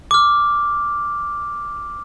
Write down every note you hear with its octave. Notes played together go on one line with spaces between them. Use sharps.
D6 F6